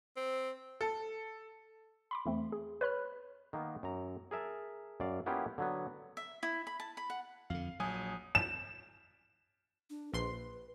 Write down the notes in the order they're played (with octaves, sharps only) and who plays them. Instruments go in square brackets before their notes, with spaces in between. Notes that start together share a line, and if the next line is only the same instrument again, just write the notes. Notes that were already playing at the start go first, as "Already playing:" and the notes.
[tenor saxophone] C4
[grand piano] A4
[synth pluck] B5 C6 D6
E2 A3 C4
G#4
B4 C#5 B5 F6
[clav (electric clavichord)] D#3 A#3 B3
F#2 A#5
G#4 A#4 E5 A5
F#2 D5 F5
A#3 B3 C#4 E4 F4 G4
D3 F#3 B3
[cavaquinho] E5
E4
B5
A5
B5
F#5
[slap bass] F2 D3 [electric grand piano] F5
[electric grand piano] A#1 G#5 D#6 [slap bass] F#3
[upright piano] E7
[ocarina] D4
[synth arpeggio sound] A#1 C6 C7 [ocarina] B4